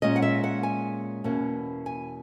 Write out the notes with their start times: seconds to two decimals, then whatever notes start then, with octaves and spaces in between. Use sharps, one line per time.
0.02 A#2 G#3 C#4 D#5
0.16 F#5
0.22 E5
0.44 F#5
0.63 G#5
1.24 E2 B2 A#3 C#4
1.86 G#5